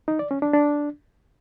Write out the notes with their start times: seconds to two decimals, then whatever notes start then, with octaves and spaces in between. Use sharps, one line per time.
0.08 D#4
0.19 D5
0.31 C#4
0.42 D4
0.54 D4